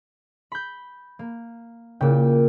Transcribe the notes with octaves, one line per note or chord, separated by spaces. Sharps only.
B5 G6
A#3
A#2 C#3 G5